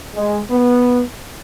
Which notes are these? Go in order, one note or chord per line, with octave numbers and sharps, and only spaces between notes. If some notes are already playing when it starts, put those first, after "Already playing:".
G#3
B3